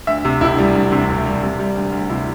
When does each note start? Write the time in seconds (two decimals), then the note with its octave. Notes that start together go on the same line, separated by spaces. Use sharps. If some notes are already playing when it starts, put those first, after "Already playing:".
0.07 D2 E5
0.25 C3
0.41 E1 E4
0.58 G3
0.75 D2
0.92 C3
1.09 E1
1.25 G3
1.43 C3
1.59 G3
1.76 D2
1.92 D2
2.09 C3 E4